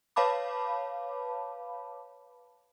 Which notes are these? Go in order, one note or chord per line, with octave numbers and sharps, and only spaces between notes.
B4 C#5 F5 A5 B5 D6